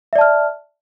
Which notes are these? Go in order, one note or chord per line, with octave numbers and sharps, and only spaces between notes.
D5 E5 A5 F6